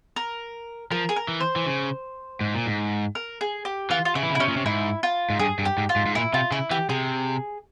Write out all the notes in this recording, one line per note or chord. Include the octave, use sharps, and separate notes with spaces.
A#4
F3 A#4
G#4
A#4
E3
C5
E3
C#3
G#2
A#2
G#2
A#4
G#4
G4
E3 F4
F4
C#3 E4
E3
C#3
E4
C3 C#4
A#2
C3
G#2 E4
F4
G#2
G2 G#4
G2
G4
G#2
F4
G#2
G#2
A#2 E4
C3 F4
C#3 E4
E3 G4
C3 G#4